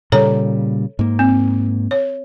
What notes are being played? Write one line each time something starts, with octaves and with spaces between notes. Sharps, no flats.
A#2 C#3 G3 A4 C#5 A#5
G#2 A#3
C4
C#5